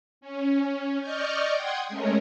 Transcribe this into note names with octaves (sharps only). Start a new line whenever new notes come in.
C#4
D5 D#5 C#6 F6 G6
F#5 G5 C6 D#6 G#6
G#3 A3 C#4 A#4 C#5